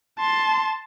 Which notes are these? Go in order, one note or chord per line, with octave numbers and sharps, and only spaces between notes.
A5 C6